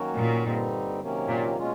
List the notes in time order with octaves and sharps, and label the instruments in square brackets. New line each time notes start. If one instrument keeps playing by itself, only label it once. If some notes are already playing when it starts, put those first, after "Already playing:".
Already playing: [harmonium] D#3 F#3 A#3 C#4 F#4
[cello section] A#2
[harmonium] G2 D3 G3 C4 D#4
C3 D#3 F#3 A#3 C#4
[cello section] A#2
[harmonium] B2 G#3 C#4 F4